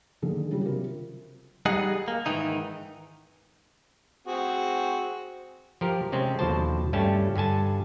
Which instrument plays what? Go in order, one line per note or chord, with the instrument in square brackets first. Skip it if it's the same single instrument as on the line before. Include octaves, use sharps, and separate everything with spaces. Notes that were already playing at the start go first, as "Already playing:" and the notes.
[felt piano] D3 D#3 A#3 D4 G#4
C#3 G3 F4 G4
C3 F#3 F4 A#4
[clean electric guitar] G3 D#4 G#4 D#5 F#5
A#3
G#2 D#3 E3 D#4
[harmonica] C4 F#4 G#4
[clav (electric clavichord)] F3 G4 A#4
C3 G#3 C4 C#4
D#2 B2 D3 F3 C5 A5
G2 G3 A3 C#4 A5
G2 D3 G#5 A5